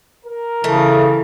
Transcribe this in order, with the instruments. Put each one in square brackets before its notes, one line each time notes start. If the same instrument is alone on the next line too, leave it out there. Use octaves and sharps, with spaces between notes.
[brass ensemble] A#4
[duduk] C#3 [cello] E3 [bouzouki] A3